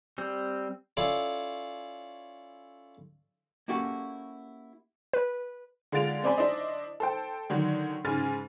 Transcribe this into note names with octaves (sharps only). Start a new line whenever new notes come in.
G3 C4
C#4 E4 F4 A4 D5
A#3 C#4 E4 F#4 G4 A4
B4
D3 G#3 F4 A6 D7 F7
C4 D5 G#5 B5 C6
D4 E4 C5 D5 D#5
A4 C5 G5
D3 D#3 F#3
G#2 C#3 G#3 G#5 F6 A6